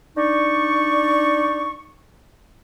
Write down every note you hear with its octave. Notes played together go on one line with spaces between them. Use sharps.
D4 D#4 D5 C#6